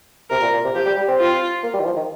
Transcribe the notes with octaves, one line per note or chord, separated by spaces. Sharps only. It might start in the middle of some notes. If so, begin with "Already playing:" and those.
C3 A#4
A#2
A#2
C3
F3 G4
G3
G3
C4
F4
A#3
G3
D#3
F3
D#3